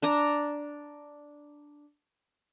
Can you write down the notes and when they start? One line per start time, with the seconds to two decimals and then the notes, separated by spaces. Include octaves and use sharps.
0.02 D4 D5 A#5